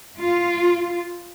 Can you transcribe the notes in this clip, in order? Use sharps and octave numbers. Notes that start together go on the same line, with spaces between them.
F4